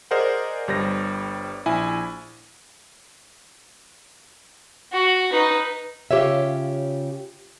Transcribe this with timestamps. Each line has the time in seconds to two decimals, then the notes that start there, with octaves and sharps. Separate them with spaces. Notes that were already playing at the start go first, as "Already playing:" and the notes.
0.11 G#4 A#4 C5 D5 D#5 F#5
0.68 G1 G3 C5 A#6
1.66 A#1 E4 G#5
4.93 F#4
5.31 D#4 B4
6.11 C#3 F4 G4 B4 C#5 E5